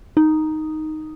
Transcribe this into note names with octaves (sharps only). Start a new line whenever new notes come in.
D#4